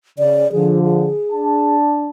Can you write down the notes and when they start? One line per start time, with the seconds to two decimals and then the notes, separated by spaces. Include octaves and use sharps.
0.19 C#3 D5
0.52 D3 F3 G#4
0.84 G#4
1.32 D4 A5